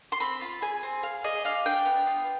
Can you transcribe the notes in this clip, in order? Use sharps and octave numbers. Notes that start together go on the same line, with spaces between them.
C6
C4 B5
F4
G#4 G#5
C4
G#4 F5
G#4 D#5
D4 F5
D4 G5
B3
F4